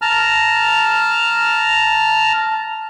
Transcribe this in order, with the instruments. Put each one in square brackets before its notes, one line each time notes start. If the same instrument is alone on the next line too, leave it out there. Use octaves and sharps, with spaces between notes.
[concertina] A5 A#5 F6